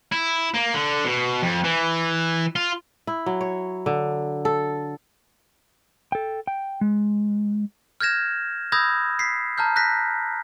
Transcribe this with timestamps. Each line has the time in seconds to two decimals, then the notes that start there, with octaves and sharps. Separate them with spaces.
0.12 E4
0.54 A#3
0.74 D3
1.05 B2
1.42 F2
1.64 E3
2.56 F4
3.07 E4
3.26 F#3
3.41 C#5
3.86 D3
4.45 A4
6.12 A4 G5
6.47 G5
6.81 G#3
8.01 F6 G6 G#6 A#6 E7
8.72 B5 D#6 E6 G6 G#6 A#6
9.19 B6 C7
9.58 A5 A#5 F6 G6
9.76 F#6 G6 A#6 B6